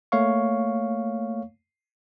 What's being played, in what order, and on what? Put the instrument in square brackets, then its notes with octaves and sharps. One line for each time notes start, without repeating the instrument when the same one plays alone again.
[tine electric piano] A3 A#3 C#5 F5 C#6